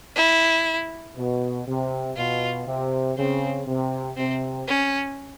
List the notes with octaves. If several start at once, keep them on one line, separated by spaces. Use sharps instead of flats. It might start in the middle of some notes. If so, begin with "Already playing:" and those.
E4
B2
C3
B2 F4
C3
C#3 C4
C3
C3 C4
C#4